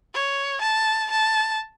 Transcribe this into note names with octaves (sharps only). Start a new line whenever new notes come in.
C#5
A5
A5